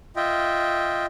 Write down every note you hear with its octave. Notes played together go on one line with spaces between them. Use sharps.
F4 D#5 E5 G5